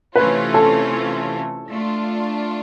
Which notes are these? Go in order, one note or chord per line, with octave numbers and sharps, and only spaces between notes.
C3 E3 A3 C#4 F4 B4
A4
A3 D4 F4